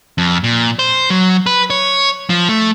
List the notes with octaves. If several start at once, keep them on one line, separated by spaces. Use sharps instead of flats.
F2
A#2
C5
F#3
B4
C#5
F3
A3